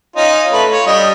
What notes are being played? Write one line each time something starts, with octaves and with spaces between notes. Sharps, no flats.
C#4 D#4 F4
A3 B4
F4 C#5
G3 D4 D#5